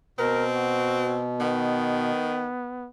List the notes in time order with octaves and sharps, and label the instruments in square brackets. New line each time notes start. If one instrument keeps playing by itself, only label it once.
[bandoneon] B2 [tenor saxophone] C4 [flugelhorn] A#4
[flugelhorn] F#4
[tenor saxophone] D#3 [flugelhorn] B3